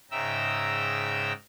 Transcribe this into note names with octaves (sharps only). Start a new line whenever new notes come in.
G#2 C#3 E5 G5 A#5 E6